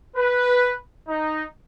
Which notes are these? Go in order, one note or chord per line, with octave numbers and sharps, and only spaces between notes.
B4
D#4